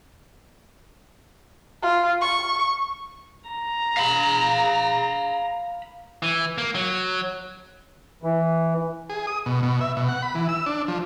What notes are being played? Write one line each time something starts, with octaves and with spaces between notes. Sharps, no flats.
F4
C#6
A#5
F5 B5
E3
A#3
F#3
E3
G#4
D#6
B2
B2
E5
B2
F#5
B5
E3
E6
D4
F3